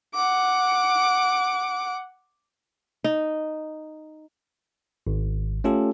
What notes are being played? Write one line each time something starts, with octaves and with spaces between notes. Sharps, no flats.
F#5 D6
D#4
G#1
A3 C#4 F4 G4 A4